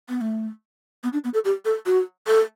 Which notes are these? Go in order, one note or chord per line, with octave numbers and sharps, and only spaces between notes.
B3
A3
B3
D4
B3
A4
G4
A4
F#4
A4